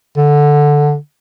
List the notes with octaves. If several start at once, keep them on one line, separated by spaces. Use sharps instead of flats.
D3